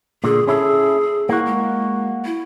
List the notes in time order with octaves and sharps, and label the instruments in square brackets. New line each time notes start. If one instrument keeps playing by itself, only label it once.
[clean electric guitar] A#2 D3 [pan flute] G#4
[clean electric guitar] C#4 E4 A4 [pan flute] G#4
[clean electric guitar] A#3 F#4 [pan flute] E4
[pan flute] G#3
E4